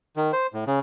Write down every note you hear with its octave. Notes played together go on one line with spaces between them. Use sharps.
D#3
C5
A2
C#3